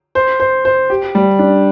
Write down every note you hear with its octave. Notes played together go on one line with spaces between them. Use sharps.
C5
C5
C5
G4
G3
D4